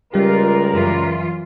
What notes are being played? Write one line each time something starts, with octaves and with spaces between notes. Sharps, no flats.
C#2 G3 F4 G4 A#4 D5
F#2 E3 F4